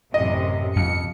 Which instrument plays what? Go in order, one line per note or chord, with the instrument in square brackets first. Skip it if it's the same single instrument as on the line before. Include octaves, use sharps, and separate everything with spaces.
[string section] A1 F#2 C3 [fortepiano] D#5
[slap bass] F2 [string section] C#7